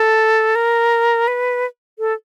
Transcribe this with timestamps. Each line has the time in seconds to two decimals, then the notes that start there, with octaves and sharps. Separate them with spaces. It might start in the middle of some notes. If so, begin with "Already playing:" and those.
Already playing: A4
0.55 A#4
1.28 B4
1.99 A4